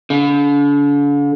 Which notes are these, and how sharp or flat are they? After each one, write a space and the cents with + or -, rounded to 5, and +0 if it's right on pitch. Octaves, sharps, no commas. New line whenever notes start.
D3 -40